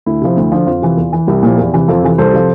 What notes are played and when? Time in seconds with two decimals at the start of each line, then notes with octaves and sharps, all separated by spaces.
0.06 D2 E4
0.22 C3 F3
0.37 D2
0.52 D3 F3
0.67 F2 F4
0.82 C3 E3
0.97 E2
1.13 E3
1.27 C2 E4 G4
1.43 A#2 F3
1.58 E2
1.74 C3 E3
1.88 F2 F4 A4
2.03 C3 E3
2.18 C2 A4 C5
2.33 C3 F3